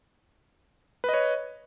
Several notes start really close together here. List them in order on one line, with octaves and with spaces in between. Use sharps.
B4 D#5 C#5